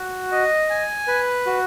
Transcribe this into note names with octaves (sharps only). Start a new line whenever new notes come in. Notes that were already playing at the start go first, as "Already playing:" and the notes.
Already playing: F#4
D#5
G#5
B4
F#4